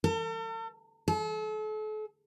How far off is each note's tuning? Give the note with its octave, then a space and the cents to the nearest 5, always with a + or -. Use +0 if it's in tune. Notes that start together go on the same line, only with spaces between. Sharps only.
A4 +45
A4 -40